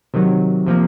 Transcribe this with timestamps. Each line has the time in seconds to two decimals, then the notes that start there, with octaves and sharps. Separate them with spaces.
0.14 C3 D#3 F#3
0.66 C3 F3 A#3